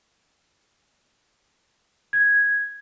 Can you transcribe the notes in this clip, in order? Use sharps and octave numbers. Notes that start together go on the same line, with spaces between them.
G#6